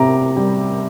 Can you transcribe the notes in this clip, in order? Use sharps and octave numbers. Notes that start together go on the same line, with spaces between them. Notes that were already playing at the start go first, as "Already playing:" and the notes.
Already playing: C3 A#5 D6
G3